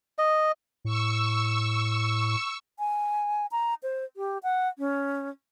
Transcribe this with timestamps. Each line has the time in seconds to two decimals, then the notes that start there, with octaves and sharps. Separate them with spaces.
0.18 D#5
0.85 A2 C#6 E6
2.79 G#5
3.52 A#5
3.83 C5
4.17 G4
4.43 F#5
4.78 C#4